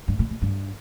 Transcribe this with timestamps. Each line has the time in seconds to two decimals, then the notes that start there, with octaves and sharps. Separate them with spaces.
0.08 G2
0.19 A#2
0.30 A#2
0.42 G2